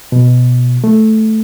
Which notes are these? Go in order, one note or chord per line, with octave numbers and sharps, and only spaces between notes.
B2
A3